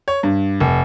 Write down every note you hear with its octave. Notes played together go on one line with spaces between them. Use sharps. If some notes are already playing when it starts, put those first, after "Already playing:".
C#5
G2
F1